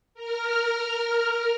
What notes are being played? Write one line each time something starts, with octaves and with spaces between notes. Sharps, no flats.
A#4 F6